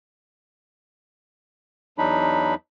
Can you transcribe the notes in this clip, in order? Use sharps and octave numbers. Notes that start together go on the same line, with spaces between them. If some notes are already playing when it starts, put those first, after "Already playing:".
E2 F#3 D4 D#4 B5